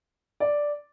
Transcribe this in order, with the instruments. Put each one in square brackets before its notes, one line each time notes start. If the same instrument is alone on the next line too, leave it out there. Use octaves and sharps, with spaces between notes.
[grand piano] D5